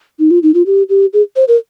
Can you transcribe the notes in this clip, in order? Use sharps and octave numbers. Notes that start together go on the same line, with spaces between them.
D#4
F4
D#4
F4
G4
G4
G#4
C5
A#4